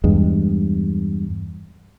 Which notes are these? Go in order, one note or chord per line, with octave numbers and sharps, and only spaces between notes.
E2 G2 G#3